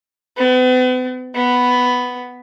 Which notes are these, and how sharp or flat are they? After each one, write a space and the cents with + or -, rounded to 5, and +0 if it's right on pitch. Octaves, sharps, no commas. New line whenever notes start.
B3 +45
B3 +5